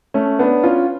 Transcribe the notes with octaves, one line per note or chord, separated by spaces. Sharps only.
A3 C#4
B3 D4
C#4 F4